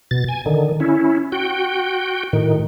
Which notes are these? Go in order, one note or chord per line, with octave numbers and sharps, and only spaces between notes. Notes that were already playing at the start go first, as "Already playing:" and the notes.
B2 A6
G#5
D3 D#3
C#4 E4
F#4 G5
A2 D#3